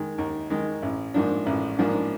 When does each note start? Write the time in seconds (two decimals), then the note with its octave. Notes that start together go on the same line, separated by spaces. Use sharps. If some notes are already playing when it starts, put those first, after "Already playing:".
Already playing: D#3 G#3
0.18 D#2
0.50 D#3 G#3
0.82 A1
1.14 G#2 F3 A#3 D4
1.46 A1
1.78 G#2 F3 A#3 D4